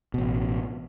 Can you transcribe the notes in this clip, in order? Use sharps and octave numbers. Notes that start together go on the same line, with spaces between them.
A1 B2